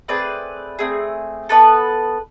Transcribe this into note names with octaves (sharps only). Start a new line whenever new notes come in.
A3 C4 G#4 B4 D5
A3 C4 G#4
B3 D4 A4 B4